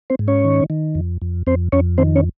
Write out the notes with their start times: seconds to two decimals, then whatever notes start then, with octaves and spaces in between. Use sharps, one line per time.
0.10 C4 C5
0.19 G#2
0.28 C#4 C#5
0.45 D#3
0.70 D#3
0.95 F2
1.22 F2
1.47 F2 C4 C5
1.72 F2 C#4 C#5
1.98 D#3 C4 C5
2.16 C#4 C#5